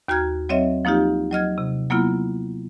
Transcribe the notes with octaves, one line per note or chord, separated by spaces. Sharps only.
D#2 F#4 A#5 F6 G#6
F#3 C4 C#5 D#5 E5
F3 A#3 D#4 F4 G4
F#3 D#5 F6 G#6
C3
F#3 A#3 B3 E4 F4